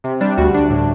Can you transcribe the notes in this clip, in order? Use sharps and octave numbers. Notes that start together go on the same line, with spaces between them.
C3
G3 D4
D2 F#4
D2 D4
A2